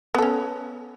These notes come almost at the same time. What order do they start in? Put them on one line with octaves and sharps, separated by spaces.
B3 A4 C#4